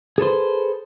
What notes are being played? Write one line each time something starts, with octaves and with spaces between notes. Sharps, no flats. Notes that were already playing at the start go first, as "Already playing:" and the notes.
G#4 A4 B4 C5